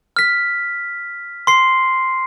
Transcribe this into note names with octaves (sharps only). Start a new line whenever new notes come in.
F6 B6
C6 C7